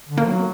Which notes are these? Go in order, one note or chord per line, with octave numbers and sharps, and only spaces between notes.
D3
A#3
F#3